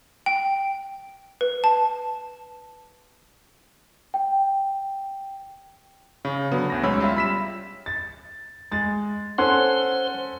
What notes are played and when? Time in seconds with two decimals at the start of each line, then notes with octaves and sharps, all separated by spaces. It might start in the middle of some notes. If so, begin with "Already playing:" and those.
0.26 G5
1.41 B4
1.64 A5
4.14 G5
6.25 C#3
6.52 D3 F#3 B3
6.70 D2 A#6
6.83 B1 G#3 C#4 C#5 B5 E6
7.00 G3 F4 E5
7.16 B5 B6 E7
7.86 A6
8.71 G#3 A6
9.38 C#4 A4 C5 F#5 C6 F#6